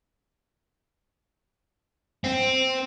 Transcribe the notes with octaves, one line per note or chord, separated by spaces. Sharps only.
C4